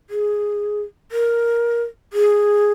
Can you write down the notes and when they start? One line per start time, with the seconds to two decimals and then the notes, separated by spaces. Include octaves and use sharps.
0.10 G#4
1.12 A#4
2.13 G#4